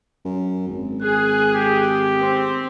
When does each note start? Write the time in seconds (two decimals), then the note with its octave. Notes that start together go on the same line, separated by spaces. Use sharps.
0.25 F#2
0.68 G#1
1.02 G#4 F#6
1.54 G4
2.18 C4